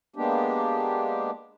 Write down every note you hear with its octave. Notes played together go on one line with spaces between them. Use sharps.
G#3 A#3 B3 D4 G4